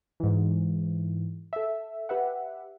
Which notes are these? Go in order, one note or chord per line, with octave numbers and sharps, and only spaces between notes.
G#2 E3
A4 E5
G4 B4 E5 F#5